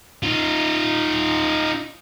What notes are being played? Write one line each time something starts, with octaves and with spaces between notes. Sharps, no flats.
D#4 F4